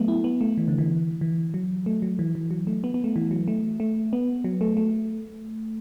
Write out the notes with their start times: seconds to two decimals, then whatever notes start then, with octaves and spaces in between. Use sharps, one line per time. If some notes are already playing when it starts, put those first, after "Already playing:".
Already playing: F#3 A3 B3
0.08 E4
0.24 B3
0.41 A3
0.57 E3
0.68 D3
0.78 E3
1.21 E3
1.54 F#3
1.86 A3
2.02 F#3
2.19 E3
2.35 E3
2.51 F#3
2.67 A3
2.84 B3
2.94 B3
3.04 A3
3.16 E3
3.31 F#3
3.48 A3
3.80 A3
4.13 B3
4.44 F#3
4.61 A3
4.77 A3